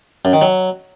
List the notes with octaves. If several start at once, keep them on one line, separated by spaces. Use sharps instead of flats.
F#2
D#3
F#3